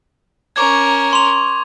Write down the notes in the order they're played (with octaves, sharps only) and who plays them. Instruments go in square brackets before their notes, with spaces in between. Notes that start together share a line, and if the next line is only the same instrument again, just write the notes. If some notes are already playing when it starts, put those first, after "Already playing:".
[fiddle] C#4 A#4 [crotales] C#6 D6 G#6
[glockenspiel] C6 F7